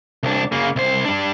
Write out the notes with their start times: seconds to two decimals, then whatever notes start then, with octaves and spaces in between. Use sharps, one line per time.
0.23 C2 D4
0.52 C#3 A#3
0.76 C2 C5
1.05 G3 D4